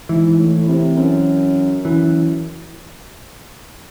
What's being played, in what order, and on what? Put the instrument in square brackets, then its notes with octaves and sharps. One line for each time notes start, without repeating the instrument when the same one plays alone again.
[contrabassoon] G#2 [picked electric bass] E3
[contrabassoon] A2
C3
F#2
[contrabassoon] F#2 [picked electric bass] E3